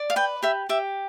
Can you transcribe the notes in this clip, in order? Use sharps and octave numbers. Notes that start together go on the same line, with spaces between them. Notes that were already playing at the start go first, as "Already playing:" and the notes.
Already playing: D5
F5
B4 G5
G4 E5
G4 E5